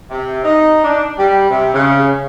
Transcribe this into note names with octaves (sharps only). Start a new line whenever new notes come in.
C3
D#4
D4
G3
C3
C#3